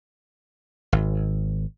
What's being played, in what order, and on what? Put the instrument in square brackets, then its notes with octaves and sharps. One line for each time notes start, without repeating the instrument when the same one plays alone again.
[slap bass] G#1